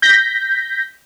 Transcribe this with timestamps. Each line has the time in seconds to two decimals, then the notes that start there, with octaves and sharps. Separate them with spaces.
0.02 G6 A#6 B6